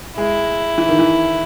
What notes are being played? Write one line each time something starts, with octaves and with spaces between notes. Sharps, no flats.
G#3 E4
E3
D#3
E3